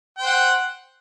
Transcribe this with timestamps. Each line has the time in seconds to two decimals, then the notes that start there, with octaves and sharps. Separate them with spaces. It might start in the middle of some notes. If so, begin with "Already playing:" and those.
0.18 G5
0.22 C5
0.25 F#5